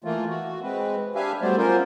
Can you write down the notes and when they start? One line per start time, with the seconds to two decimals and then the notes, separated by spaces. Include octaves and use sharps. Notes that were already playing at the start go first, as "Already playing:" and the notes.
0.04 E3 A3 A#3 F4
0.29 F#4
0.62 G#3 C4 B4
1.15 D4 G4 B4 E5 F5 G#5
1.41 F#3 G3 A3 B3 C5 D5
1.57 C#4 F4 A#4 C5